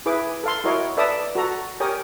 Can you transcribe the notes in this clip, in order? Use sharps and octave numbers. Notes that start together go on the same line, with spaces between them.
E4 G#4 B4 D6
A4 F5 C6
E4 F#4 A#4 C#5 D#5
A4 B4 D5 E5 A5 D#6
F#4 A4 A#5
G4 A#4 C#5 G#5 D#6